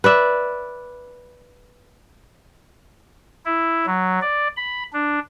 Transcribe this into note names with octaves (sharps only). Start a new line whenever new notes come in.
B4 D5 E5
E4
F#3
D5
B5
D4